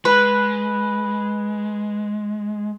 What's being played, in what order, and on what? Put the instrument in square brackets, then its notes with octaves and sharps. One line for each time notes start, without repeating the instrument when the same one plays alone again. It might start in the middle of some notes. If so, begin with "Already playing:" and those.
[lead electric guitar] G#3 [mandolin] B4